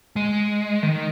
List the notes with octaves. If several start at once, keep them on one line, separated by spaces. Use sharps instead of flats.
G#3
D#3